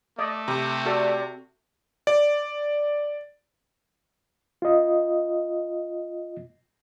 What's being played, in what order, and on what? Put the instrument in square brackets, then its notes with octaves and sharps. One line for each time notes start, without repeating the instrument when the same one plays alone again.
[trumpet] A3 [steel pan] D5 D#5
[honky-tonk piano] C3
[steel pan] F#4 A4 [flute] D5
[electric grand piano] D5
[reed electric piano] F4 D#5